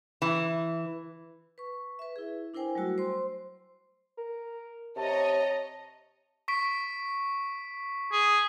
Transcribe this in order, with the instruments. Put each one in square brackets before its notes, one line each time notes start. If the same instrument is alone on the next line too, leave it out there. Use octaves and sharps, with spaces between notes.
[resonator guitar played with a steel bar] E3
[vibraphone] B4 C#6
B4 E5
E4 G#4
D4 E4 A#4 C5 G5 G#5
F#3 G3 A3 F#4 E6
C5 C6
[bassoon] A#4
[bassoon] C3 [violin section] C#5 D#5 A#5 [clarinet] A5
[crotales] C#6 B6 D7
[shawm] G#4